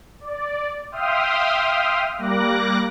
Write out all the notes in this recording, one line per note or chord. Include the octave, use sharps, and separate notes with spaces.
D5
E5 F5 G5 C6 D#6 F6
G3 A#3 D6 F#6 A#6